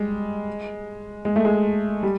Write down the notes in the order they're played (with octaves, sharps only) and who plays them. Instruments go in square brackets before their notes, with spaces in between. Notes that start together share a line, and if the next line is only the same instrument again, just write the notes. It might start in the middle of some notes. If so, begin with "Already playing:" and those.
Already playing: [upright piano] G3 G#3
G#3
A3
G#3
G3